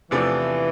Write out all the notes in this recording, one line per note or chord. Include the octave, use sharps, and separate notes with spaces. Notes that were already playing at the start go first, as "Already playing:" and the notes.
E2 C3 E3 F3 A3 D4